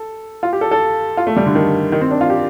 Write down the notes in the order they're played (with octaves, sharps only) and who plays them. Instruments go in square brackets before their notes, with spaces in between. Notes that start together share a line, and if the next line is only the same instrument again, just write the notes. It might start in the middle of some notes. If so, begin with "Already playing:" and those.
Already playing: [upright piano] A4
F4
G4
A4
A4
F4
A3
G3
D3
D#3
D#3
C4
D4
F4
G4